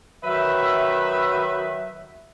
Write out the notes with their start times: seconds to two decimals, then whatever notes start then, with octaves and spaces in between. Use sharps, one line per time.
0.23 D#3 F#3 B4 E5